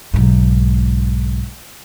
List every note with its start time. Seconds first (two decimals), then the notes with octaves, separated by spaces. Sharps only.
0.14 B1 G#2